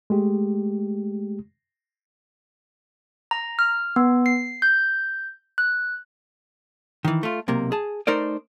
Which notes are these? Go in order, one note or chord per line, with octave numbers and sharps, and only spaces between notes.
G#3 A3 G4
A#5
F6
B3
C7
G6
F#6
D#3 E3
A3 F4
B1 C3 A#3
G#4 A5
A3 D#4 A#4 C5 D5